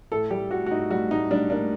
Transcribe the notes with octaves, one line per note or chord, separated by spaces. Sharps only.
A2 A4
G3 G4
A2 F#4
F#4
A2 D#4
G3 F#4
A2 D#4
G3 D4
A#3 D4